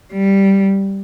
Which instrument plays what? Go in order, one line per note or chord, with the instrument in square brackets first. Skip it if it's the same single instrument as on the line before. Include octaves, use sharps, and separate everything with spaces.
[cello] G3